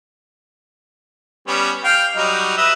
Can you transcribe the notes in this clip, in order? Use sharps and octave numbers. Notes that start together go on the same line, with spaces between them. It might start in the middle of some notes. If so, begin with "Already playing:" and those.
G3 B3 C#4
F5 G5
F#3 G3 D#4
B4 D#5 E5